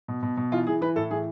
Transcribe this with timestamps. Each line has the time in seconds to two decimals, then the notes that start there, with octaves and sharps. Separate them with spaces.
0.08 B2
0.23 B2
0.37 B2
0.52 E3 F4
0.67 E3 G#4
0.81 E3 B4
0.96 A2 A4
1.10 E3 G#4